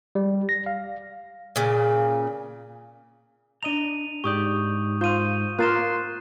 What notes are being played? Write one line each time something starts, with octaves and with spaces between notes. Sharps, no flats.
G3
A#6
F5
A#2 C#3
D4 D#5 A#5 D#7 F7
G#2 G4 D5 C#6 D#6 G6
F4 C5 F5 G6 D#7
A#3 F4 A#4 C6 F#6 A6 E7